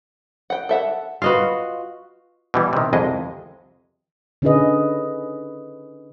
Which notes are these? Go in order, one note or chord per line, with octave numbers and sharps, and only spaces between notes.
F#5 G5
A4 E5 F#5
F4 F#4 B4 D#5 F5
B2 E3 G3
C3 D#3
C2 F2 G#3 D#5
D3 C#4 D#4 G#4 B4 D#5